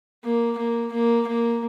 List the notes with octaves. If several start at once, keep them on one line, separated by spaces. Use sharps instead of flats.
A#3
A#3
A#3
A#3